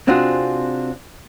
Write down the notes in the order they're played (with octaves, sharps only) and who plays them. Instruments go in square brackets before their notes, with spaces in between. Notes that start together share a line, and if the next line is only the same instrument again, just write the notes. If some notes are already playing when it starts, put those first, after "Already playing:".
[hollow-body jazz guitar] C3 C4 D4 F4 F#4 G#4